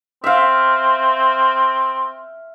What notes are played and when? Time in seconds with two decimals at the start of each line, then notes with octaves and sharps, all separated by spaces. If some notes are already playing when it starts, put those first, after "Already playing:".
0.24 C4 E5 F5